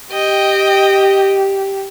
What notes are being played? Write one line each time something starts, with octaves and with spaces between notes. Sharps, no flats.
G4 D#5 G5